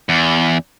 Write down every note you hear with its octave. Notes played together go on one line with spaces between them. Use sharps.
E2